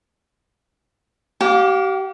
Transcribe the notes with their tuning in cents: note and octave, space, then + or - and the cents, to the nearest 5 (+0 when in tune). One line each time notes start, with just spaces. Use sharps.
G4 -35 F5 +30 D6 +0